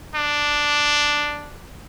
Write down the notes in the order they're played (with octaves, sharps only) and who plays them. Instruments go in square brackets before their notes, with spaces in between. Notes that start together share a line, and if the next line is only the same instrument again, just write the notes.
[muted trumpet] D4